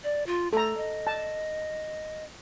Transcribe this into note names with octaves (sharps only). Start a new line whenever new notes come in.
D5
F4
A3 A4 A#5
D#5
A5